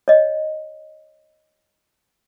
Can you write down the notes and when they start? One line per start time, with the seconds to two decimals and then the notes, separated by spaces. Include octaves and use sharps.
0.08 C#5 D#5